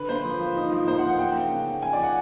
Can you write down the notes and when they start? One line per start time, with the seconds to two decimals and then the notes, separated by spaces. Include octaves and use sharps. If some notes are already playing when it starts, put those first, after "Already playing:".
Already playing: D3 B4
0.09 A#3 C5
0.25 F3
0.40 F3
0.56 D#4
0.72 F3
0.87 A#3 C5
0.98 F#5
1.03 D#4
1.09 F#5
1.19 A#3 G5
1.35 C#3
1.51 C#4
1.66 A#3
1.83 F3 G#5
1.93 F3 D5
2.03 F#5